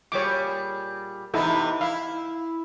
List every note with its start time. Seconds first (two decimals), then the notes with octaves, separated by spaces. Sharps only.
0.12 A#2 G3 G#4 C#5 D6
1.34 C3 E3 B3 D#4 E4 A4
1.81 E4 F5